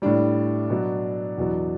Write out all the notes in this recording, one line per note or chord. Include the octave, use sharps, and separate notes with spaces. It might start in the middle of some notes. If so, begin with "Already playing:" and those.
A2 G3 D4
B2 F#3
E2 B2 F#3